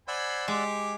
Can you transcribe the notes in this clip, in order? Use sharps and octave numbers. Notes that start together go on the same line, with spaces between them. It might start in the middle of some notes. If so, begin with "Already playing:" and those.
C5 D5 F#5 G#5 B5 E6
G#3 G4